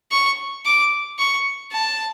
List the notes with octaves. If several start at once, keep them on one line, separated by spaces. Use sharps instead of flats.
C#6
D6
C#6
A5